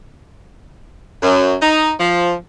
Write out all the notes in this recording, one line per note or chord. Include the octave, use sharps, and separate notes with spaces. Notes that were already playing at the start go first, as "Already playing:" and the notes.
F#2
D#4
F3